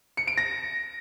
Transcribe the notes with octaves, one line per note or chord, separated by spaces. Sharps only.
C#7
D7
A#6